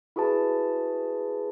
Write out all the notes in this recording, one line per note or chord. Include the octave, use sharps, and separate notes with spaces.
E4 F#4 G#4 B4 A5